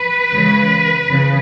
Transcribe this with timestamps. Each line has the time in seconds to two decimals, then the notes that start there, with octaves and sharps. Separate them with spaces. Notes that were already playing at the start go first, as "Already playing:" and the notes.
Already playing: B4
0.34 C#3 E3 G#3
1.10 C#3 E3